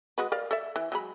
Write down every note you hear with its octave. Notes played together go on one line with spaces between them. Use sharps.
G#3 F#4 B4
A#4 D5 F5
A4 D5 E5
E3
F#3 G#3 B5